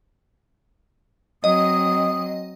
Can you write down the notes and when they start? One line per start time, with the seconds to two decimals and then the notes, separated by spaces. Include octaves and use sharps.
1.44 F#3 C4 D#5 D#6